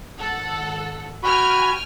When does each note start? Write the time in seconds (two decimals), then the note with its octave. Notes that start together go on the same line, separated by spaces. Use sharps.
0.18 G#1 A4 F#5
1.23 F#4 G5 G#5 B5 F6